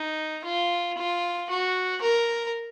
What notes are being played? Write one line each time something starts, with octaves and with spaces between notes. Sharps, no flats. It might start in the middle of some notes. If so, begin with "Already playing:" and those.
Already playing: D#4
F4
F4
F#4
A#4